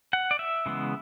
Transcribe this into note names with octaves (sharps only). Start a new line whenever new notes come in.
F#5
D5
E5
C#3 E3 G#3 B3